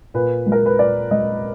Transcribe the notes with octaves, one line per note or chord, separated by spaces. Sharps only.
A#2 B4
G#3
A#4
B4
A#2 D5
G#3 D#5